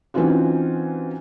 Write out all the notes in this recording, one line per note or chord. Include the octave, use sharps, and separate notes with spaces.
E3 C4 C#4 D#4 F4 F#4